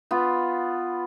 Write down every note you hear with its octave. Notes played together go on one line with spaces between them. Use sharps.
B3 F4